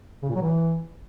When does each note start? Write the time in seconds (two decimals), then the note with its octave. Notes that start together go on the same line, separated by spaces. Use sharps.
0.22 C#3
0.29 A#2
0.35 F#3
0.42 E3